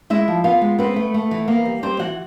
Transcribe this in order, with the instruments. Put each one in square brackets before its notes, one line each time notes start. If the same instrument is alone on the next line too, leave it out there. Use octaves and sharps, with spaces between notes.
[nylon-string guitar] G#3 E4 E5
F3
B3 F4 F5
G#3
B3 C4 B4
A3
A3
E3
A#3 B3 A#4
G3
G3 C4 C5
E3 F#4 F#5